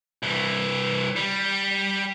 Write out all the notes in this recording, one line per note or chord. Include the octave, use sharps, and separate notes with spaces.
C2 E3
G3